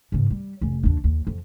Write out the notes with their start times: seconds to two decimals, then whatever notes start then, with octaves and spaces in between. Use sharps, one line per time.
0.12 G#2 C#3
0.30 G3
0.61 F1 C#4
0.83 D#2 D4
1.04 D#2
1.27 F2